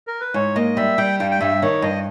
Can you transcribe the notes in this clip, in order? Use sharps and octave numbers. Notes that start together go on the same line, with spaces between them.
A#4
B4
G#2 C#5
A#3 D#5
G3 E5
G3 G5
G2 G5
G5
G2 E5
D#3 C#5
G2 D#5